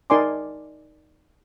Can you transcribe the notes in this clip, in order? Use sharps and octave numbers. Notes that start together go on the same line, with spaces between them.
D#4 A#4 D5 G#5 C6 D6